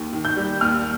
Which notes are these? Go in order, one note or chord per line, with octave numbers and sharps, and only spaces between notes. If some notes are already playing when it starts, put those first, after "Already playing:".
Already playing: D#2
D#3
G6
G3
D#2 F6